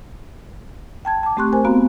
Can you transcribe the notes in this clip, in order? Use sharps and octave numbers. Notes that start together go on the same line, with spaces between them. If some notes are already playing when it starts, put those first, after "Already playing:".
G5 A5 G#6
A5 D6
A3 C4 G4 C6 C#6 F#6
A#4 C5 G#5
B3 C4 F#4 F5 A#5